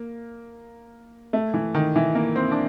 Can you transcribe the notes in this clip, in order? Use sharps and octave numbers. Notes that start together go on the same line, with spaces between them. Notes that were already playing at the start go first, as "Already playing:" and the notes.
Already playing: A#3
A3
E3
D#3
E3
A#3
C4
D4